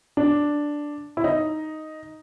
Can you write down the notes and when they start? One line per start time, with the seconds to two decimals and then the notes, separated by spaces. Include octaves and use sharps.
0.17 D4
1.17 E4
1.24 D#4